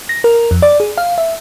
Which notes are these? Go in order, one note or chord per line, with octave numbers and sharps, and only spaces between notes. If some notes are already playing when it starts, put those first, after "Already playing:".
A#6
A#4
F2
D5
G#4
F5
E5